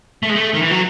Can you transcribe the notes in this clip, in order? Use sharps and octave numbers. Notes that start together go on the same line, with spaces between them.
A3
G#3
A3
D#3
E3
F#3